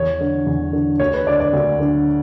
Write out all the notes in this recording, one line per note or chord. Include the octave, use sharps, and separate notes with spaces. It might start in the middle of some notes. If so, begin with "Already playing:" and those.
Already playing: E2 C#5
D3
E2
D3
D2 C#5
B4
D3 D5
D5
D2
D3